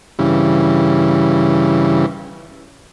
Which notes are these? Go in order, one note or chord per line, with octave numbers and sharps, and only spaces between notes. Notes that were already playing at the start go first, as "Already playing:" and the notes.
G2 C#3 E3